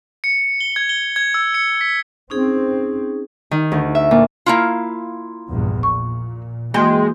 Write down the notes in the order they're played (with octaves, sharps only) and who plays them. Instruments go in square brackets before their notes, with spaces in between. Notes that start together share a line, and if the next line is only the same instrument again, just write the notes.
[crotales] C#7
G7
G#6
G7
G#6
E6
C#7
B6
[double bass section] C4 [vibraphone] C#4 D#4 G#4
[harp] D#3
D2
E5
A#2
[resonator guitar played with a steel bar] A#3 E4 F4
[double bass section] A#1 E2 G2
[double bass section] A#2 [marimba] C#6
[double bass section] E3 [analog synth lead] G#3 [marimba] A#3 F#4 C6 [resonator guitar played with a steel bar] G5